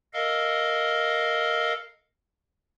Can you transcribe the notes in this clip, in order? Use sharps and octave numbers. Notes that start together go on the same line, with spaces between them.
A4 A#4 D#5 F5